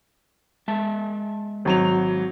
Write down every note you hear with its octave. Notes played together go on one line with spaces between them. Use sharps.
G#3 E5 A5
G#1 F#3 F7